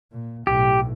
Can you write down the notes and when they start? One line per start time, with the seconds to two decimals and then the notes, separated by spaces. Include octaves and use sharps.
0.12 A#2
0.47 B1 A2 G4